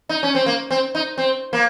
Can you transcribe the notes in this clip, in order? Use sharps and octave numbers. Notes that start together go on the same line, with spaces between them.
D#4
C#4
C4
A#3
C4
D#4
C4
A#3